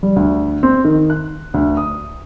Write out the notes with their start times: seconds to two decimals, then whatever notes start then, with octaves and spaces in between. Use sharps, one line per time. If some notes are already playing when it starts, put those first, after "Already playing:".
0.03 G3
0.16 D2
0.63 C4
0.85 D#3
1.10 F#6
1.54 D2
1.77 D#6